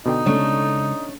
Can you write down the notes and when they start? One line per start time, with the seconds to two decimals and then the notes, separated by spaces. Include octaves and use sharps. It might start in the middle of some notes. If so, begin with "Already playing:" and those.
0.06 B2 D3 D#4 G5
0.26 C#3 G#3 A3 C#4 D4